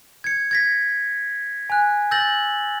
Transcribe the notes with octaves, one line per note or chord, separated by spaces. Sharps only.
G#6 C#7
G#6 A#6 B6
G#5 F#6
E6 G6 A6 A#6 F#7